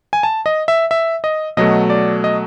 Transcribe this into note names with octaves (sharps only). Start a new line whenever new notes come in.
G#5
A5
D#5
E5
E5
D#5
B2 F#3 A3 D#5
D5
D#5